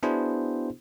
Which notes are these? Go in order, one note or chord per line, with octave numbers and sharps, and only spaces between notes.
B3 D4 E4 F#4 G#4 C5